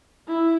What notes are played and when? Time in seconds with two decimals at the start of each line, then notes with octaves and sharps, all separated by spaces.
0.28 E4